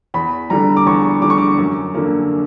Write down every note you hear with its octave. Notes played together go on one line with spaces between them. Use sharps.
E2 B5
D3 G3 A#5
D6
E2 C#6
D3 G3 D6
C#6
D6
F#2
D3 A#3